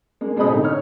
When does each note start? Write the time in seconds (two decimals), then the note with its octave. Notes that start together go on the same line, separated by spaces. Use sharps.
0.21 G#3 A#3
0.36 B2 G#3 C4 D#5 B5 D#6
0.49 A2 D3 D#4
0.64 C#5 F6